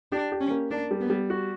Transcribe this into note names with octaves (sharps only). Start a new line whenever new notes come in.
D4 G4
G4
C#4
A#3
A#3 D4
G3
B3
G3
F#4